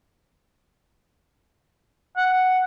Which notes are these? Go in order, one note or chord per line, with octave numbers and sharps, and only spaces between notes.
F#5